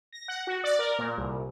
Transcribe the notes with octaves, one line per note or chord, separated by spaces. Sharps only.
A#6
F#5
F#4
D5
A#4
A#2
C2